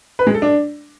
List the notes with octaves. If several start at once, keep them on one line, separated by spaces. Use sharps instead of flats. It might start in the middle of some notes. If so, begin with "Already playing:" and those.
B4
G#3
A4
D4